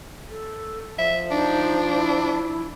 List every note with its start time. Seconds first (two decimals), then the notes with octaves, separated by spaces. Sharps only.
0.30 A4
0.98 F3 E5
1.31 D4 D#4
1.92 E4